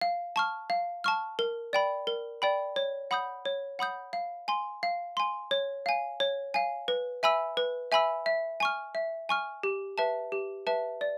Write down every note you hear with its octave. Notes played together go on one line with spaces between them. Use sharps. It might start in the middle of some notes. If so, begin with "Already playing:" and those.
F5
A5 C#6 F6
F5
A5 C#6 F6
A#4
D5 G5 B5
A#4
D5 G5 B5
C#5
F#5 B5 D#6 G6
C#5
F#5 B5 D#6 G6
F5
G#5 C6
F5
G#5 C6
C#5
F5 G#5
C#5
F5 G#5
B4
E5 G#5 B5 E6
B4
E5 G#5 B5 E6
E5
G#5 C#6 F6
E5
G#5 C#6 F6
G4
B4 E5 A5
G4
B4 E5 A5
D5